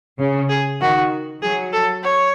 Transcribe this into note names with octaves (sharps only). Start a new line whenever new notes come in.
C#3
G#4
D#3 F#4
F#3 G#4
A4
C#5